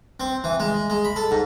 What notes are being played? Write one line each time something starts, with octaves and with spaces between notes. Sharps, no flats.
C4
E3
G#3
G#3
B5
A4
G#2